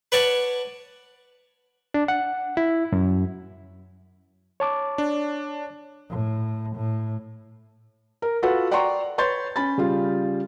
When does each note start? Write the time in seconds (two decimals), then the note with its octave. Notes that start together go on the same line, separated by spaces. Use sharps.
0.12 B4 C#5 D5 F#5 A5
1.94 D4
2.08 F#5
2.57 E4
2.92 F#2
4.60 C#5 A5 D6
4.98 D4
6.09 A2
6.76 A2
8.22 A#4
8.42 F4 F#4 A4 B4 F#5
8.71 D5 F#5 G5 A#5 C6 C#6
9.18 B4 C#5 C6 G6 A6
9.56 C#4 B5 A6
9.78 C#3 G3 F4